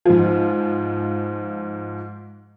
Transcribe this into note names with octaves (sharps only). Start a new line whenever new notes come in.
G#2 F3